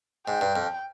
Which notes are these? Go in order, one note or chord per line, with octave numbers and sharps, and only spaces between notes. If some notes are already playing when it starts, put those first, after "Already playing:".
G#2 G5
G2
F2